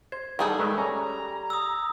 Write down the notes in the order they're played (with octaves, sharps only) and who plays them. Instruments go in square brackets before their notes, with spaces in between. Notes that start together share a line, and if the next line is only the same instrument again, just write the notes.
[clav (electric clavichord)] C5 [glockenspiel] G#6
[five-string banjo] G3 G#4 A4 [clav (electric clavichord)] B3 D#4
[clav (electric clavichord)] D#3 B4 E5 [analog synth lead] G#3
[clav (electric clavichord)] C#4 [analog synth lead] A#5
[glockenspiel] D#6 E6